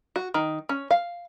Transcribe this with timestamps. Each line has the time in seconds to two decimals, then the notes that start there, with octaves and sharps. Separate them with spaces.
0.16 F#4
0.34 D#3
0.69 C#4
0.91 F5